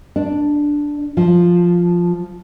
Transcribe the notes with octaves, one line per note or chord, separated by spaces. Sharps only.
D4
F3